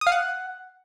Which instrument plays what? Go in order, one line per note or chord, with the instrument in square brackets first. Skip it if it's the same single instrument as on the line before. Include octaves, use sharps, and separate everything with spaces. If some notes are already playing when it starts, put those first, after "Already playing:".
[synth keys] D#6
F5
F#5